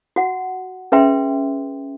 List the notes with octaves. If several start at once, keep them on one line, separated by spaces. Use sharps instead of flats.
F#4 F#5
C#4 G#4 B4 E5 G5 C6